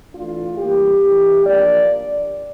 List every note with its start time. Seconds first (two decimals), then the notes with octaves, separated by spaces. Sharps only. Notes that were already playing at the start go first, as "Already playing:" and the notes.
0.14 E3 A3 D4 F4
0.57 E3 G3 A#3 G4
1.01 E3 A3 E4
1.46 F3 A#3 D4 D5